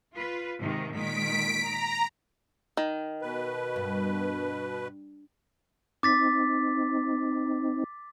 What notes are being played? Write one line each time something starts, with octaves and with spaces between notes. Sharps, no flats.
F4 B4
G#2 C3 D#3
A#2 D#3 G#3 B6 D7
A#5
D#3
B2 B4
G2
C4 D#4 D6 A6 B6